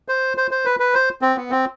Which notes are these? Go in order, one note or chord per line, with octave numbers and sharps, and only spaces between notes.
C5
C5
C5
B4
B4
C5
C4
B3
C4